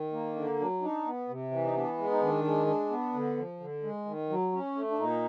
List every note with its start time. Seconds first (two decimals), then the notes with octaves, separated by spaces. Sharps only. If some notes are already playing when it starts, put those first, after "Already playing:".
Already playing: D#3
0.12 A#3
0.36 D3 D4
0.60 F#3 D4
0.82 D4 D#4
1.06 B3
1.29 C3
1.51 E3
1.65 D#4
1.75 B3 D4
1.98 G#3
2.11 D#4
2.21 D#3 D4
2.44 G#3
2.67 D4
2.90 B3
3.14 D3
3.37 F3
3.60 D3
3.83 G#3
4.05 D#3
4.30 F#3
4.52 C#4
4.75 A3
4.90 D4
4.98 A#2 D#4